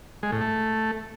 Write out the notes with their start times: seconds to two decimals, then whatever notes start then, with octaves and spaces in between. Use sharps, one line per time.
0.23 G#3
0.32 A2
0.41 A3